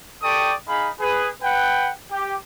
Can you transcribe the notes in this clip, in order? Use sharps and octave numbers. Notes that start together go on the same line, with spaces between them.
G4 A4 D5 G5 C#6 D#6
D#4 G#4 F5 B5
G#4 B4
B4 F#5 G5
G4